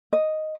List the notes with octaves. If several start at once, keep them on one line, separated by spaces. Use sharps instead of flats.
D#5